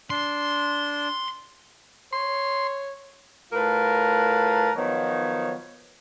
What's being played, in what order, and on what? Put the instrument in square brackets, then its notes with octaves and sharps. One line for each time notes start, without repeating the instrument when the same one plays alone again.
[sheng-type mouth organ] D4 [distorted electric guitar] C6
[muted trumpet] C#5 [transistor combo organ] C6
[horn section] A2 F4 A#4 B4 A5 A#5
D#3 F3 F#3 B3 D#4 C#5